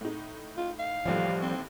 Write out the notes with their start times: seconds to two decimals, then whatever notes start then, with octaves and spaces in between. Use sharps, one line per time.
0.01 A2 D#4
0.57 F4
0.79 F5
1.06 A1 D#2 A2 F3 G3
1.42 C4